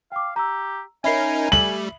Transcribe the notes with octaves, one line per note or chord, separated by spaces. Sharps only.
F5 G5 D6
G4 A#5 E6
C#4 D#4 A#4 E5 G#5 B5 C7
G3 A3 F#7